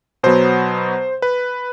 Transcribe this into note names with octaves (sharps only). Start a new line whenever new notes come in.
B2 F#3 B3 C5
B4